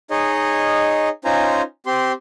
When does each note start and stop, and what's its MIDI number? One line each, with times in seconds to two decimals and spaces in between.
0.11 1.09 63
0.11 1.09 68
0.11 1.09 73
0.11 1.09 75
1.25 1.62 61
1.25 1.62 63
1.25 1.62 65
1.25 1.62 72
1.25 1.62 80
1.25 1.62 82
1.86 2.12 60
1.86 2.12 67
1.86 2.12 84